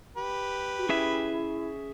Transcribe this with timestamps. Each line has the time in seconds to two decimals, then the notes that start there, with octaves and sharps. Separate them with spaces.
0.17 G4 B4
0.78 F#4
0.89 C#4 E4 G#4 E5